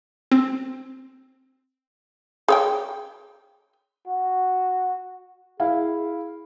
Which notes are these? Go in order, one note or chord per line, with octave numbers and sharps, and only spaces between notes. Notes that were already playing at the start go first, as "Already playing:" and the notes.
C4
G#4 C#5 G5
F#4
E4 G#4 F5